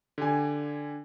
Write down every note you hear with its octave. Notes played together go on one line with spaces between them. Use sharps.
D3 G4 G#5